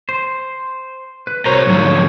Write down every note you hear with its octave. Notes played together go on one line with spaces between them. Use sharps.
C5
B4
C2 F#4 A#4 C5 C#5 A#5
G#2 D3 F3 F#3